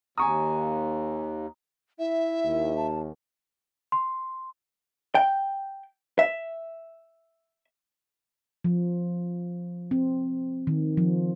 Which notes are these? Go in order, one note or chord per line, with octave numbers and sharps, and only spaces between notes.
D#2 G#5 A#5 C#6 D#6
E4 E5
D#2
A5
C6
G5
E5
F3
C4
D#3
F3